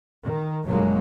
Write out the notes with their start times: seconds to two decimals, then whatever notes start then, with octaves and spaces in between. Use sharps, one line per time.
0.24 D#3
0.64 G1 F#2 B2 F#3 G#3 A#3